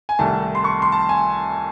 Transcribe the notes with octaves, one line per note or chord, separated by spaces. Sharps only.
G#5
C2 C3 D#3 A3 A5
C6
C#6
C6
A5
G#5